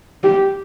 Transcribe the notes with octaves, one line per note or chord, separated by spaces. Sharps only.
G4